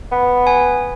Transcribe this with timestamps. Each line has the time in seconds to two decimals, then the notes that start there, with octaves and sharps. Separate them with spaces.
0.12 B3
0.47 G#5